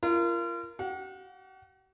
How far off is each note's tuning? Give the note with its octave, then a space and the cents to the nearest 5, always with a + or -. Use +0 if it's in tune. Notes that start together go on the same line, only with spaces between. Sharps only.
F4 -35 A#4 +0
F#4 +45 F#5 -35